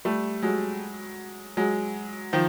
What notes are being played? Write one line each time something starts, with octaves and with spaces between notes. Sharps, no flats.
G3 A3
F#3 G#3
F#3 G#3
D#3 F3